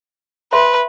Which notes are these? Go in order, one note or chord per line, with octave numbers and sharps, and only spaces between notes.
B4 C5 E5 C6